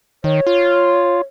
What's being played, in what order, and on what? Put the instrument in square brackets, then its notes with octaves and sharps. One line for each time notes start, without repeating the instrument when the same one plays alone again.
[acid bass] D#3 [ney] C#5
[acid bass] F4